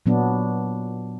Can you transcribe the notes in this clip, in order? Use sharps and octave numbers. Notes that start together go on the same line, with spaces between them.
A#2 F#3 B3 D4